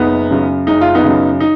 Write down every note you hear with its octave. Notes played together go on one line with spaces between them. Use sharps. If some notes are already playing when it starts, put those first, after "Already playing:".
Already playing: F#1 B3 D#4
F#2 C#3
F#1 D#4
F4
B3 D#4
F#2 C#3
D#4